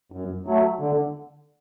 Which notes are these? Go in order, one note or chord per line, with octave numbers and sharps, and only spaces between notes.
F#2
F#3 A3
D3